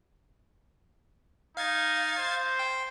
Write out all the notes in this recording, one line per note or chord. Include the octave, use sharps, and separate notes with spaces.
D#4 F5 G#6 A6
C5
G5